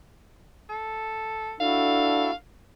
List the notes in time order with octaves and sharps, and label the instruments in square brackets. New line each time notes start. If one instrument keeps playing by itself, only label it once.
[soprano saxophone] A4
[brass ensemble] D4 A4 [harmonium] E4 F#4 [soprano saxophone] F5